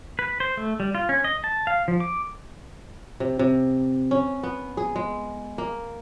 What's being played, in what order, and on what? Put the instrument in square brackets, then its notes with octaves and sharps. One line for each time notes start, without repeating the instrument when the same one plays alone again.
[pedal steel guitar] B4
C5
A3
G3
F4
C#4
D#5
A5
F5
F3
D6
[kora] C3
C3
C#4
B3
G#4
G#3
A#3